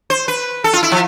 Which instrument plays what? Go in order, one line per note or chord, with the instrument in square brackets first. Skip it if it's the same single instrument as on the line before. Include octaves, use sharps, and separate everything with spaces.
[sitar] C5
B4
A4
F4
E4
F3